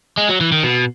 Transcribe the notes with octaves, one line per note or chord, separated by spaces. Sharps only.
G#3
F#3
E3
D#3
B2